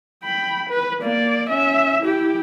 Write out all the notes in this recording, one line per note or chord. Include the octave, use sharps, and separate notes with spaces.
G5 B5
B4
A#3 D5
C#4 E5
E4 G4